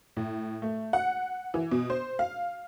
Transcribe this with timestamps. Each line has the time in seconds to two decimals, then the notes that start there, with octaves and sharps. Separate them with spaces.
0.17 A2
0.62 A3
0.93 F#5
1.54 E3
1.71 B2
1.90 C5
2.19 F5